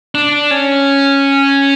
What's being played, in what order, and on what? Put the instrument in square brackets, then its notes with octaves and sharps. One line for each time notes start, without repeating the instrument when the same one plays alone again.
[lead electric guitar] D4
C#4